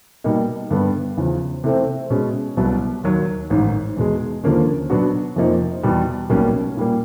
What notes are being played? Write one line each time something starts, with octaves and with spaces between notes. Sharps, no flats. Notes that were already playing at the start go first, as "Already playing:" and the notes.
B2 G3 A#3 D#4
G2 D3 G3 B3
E2 C#3 F3
C3 E3 A3 C4
B2 G#3 C#4
C2 B2 F#3 B3
D#2 D#3 F#3
A1 G#2 D#3
E2 B2 G#3
D#2 D3 F3 A#3 C#4
B2 F#3 B3 D4 F#4
F2 C3 F3 A#3 D#4
E2 B2 G3
B1 B2 G3 A#3 C#4
A#2 G3 A#3